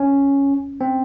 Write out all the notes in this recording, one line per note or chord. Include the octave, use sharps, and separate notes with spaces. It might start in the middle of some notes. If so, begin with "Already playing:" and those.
Already playing: C#4
C4